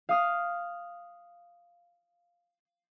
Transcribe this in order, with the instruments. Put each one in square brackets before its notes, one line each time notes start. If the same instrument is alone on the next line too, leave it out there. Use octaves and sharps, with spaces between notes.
[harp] F5 D#6 F6